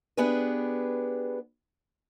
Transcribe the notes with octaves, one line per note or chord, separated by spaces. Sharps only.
B3 D4 G4 G#4 B4